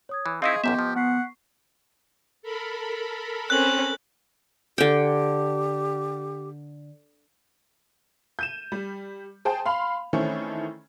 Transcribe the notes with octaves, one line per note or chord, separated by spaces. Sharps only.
C#5 D#6 G#6
E3
C4 D#4 E4 G#4 D#5 F5 C6 C#6
A1 F#2 B3 G4 E5
F3
B3 F#5 C#6 B6 C7
A4 A#4 B5
C4 C#4 F#6 F#7
D3 G4 G5
G6 D#7 E7
G3
G#4 C5 G5 A5
F5 B5 C6 F7
D#3 E3 A3 C4 C#4